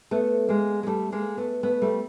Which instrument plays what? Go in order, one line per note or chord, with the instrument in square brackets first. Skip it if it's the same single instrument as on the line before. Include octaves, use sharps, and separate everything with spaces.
[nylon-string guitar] A3 B3
G#3 A#3
G#3
G3 A3
G#3 A#3
A3 B3
A3 B3
G3 A3